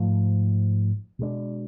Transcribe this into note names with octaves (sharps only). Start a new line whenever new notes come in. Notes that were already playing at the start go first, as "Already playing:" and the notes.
Already playing: G#2 F3 A3
B2 G#3 D4